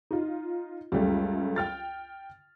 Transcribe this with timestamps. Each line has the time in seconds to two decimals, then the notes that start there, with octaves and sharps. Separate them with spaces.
0.11 D#4 F4
0.92 C#2 F#2 C#3 G3 A3
1.56 G5 F6 A6